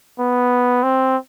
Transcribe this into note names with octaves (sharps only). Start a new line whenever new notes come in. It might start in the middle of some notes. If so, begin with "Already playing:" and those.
B3
C4